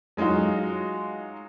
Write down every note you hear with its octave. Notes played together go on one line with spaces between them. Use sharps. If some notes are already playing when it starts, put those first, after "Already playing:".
F#3 G#3 D#4 F4 F#4